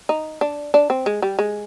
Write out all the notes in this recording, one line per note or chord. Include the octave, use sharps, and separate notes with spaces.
D#4
D4
D4
C4
G#3
G3
G#3